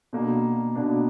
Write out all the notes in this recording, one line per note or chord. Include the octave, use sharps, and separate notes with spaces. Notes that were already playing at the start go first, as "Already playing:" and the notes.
B2 A#3 D4
B2 A#3 D4